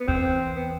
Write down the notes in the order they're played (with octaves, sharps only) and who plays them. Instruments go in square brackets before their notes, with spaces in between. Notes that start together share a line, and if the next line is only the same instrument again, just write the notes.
[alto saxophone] B3
[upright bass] E2 [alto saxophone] C4
[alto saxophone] B3